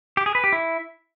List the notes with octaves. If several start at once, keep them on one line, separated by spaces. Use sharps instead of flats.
G4
G#4
B4
G4
E4